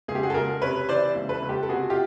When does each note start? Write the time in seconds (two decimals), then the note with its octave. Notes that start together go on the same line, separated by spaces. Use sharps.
0.08 C#2 G#4
0.15 G4
0.23 F#4 G#4
0.30 A4
0.34 C#2 G#4 A#4
0.62 C3 B4 C#5
0.89 E3 C5 D5
1.15 C#2
1.29 A4 B4
1.42 C#2
1.49 G4 A4
1.63 A4
1.69 C3 F#4 G#4
1.90 F4 G4